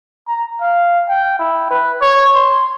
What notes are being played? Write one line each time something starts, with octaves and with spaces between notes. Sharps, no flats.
A#5
F5
G5
E4
B4
C#5
C6